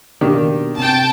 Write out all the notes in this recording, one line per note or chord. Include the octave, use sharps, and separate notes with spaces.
B2 D#3 A#3 D4 G4
C3 G5 A5